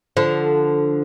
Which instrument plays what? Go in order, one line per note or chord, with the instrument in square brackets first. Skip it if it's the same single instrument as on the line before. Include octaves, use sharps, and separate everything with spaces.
[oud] D3 F3